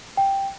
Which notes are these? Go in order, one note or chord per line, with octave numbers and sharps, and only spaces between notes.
G5